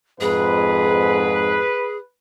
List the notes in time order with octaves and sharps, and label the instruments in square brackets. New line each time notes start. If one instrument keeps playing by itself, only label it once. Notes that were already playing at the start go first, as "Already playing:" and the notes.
[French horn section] F2 G#2 [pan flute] G#4 [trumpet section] B4